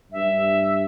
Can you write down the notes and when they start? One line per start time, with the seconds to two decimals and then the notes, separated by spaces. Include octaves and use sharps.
0.12 G2 E5